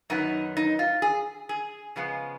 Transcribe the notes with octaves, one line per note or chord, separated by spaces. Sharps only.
F#2 D#3 F#3 B3 D#4
D#4
F4
G#4
G#4
C#3 F3 G#3 B3